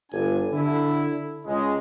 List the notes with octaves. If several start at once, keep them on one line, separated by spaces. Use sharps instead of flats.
G1 D4 G#5
D3 E4
C#2 G#3